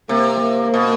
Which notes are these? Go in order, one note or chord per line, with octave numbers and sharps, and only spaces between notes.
C3 A#3
A#3
B2